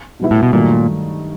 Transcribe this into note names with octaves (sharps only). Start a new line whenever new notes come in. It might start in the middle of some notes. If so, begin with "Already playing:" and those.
B2 G3 B3 E4
A2
B2
G2 A#2 D#3 F#3 A3